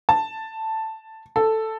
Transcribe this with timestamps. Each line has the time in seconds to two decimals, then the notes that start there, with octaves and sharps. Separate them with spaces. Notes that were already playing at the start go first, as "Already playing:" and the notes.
0.09 A5
1.36 A4